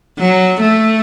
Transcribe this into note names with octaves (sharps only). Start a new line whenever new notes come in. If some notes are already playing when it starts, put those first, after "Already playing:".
F#3
A3